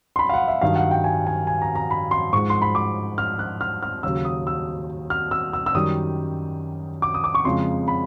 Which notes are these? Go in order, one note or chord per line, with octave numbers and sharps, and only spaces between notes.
C6
B5
F5
F#5
E5
G2 D#3 F#3 F5
F#5
G5
G#5
G#5
G#5
A#5
A#5
B5
C6
G#2 F3 G#3 C#6
C6
B5
D6
F6
F#6
F6
F6
D#2 C#3 F#3 E6
D#6
E6
F6
E6
E6
E6
F#2 D#3 G3 D#6
D6
D#6
D6
C#6
F2 C#3 F3 G#3 C6
B5